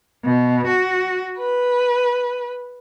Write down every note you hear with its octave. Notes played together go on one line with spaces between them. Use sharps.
B2
F#4
B4